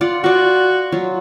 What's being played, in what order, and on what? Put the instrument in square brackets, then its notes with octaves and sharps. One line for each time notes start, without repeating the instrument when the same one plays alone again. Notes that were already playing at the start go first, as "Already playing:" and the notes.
[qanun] F4 D5 F#5
[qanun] F4 D5 [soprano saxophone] F#4
[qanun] F#3 F4